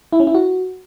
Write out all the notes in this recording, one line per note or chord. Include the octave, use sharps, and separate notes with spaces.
E4
C#4
E4
F#4